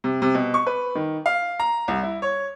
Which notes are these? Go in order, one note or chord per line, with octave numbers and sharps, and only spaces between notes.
C3
C3
B2
C#6
B4
D#3
F5
A#5
C2
E4
C#5